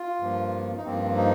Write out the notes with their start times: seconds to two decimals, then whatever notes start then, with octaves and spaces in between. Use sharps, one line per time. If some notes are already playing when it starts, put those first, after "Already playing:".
Already playing: F4
0.20 G2 F3 A#3
0.77 D#4
0.85 G2 F3 A#3 C4
1.17 D#4